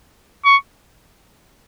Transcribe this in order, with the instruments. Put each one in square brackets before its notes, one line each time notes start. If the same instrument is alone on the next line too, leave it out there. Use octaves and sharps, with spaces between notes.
[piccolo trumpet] C#6